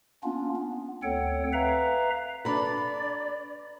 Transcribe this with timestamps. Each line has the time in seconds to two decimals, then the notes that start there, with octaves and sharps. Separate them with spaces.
0.23 A#3 B3 C#4 D4 F4
0.56 B3
1.03 D2 C4 A4 C#5 F#5 G5
1.53 B4 E5 F5 A#5
2.45 D4 A4 B4 D5 A#5 B5